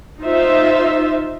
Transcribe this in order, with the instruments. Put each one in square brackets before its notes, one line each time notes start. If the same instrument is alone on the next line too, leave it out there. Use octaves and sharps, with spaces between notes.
[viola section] D#4 F4 C5 E5